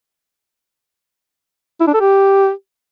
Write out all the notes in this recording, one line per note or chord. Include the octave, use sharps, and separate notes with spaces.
E4
D4
A4
G4